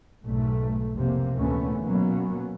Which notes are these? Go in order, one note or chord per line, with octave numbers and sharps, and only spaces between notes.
B1 G#2 A3
F1 C3 A#3
D2 A#2 E3 A3 B3 C#4
B2 F#3 A#3 B3 C#4